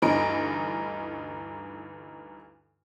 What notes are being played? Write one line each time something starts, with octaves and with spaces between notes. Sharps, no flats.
D2 G2 E3 D#4 D7